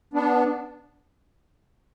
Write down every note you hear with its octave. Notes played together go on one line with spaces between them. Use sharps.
B3 D4